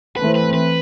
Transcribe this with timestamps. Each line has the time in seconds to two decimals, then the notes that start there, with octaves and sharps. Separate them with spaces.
0.17 E3 A3 C4 B4
0.35 B4
0.54 B4